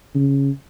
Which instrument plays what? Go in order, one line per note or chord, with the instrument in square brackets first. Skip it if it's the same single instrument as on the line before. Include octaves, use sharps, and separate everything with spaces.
[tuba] C#3